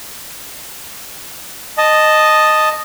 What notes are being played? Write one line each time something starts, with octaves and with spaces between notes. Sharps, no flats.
D#5 A5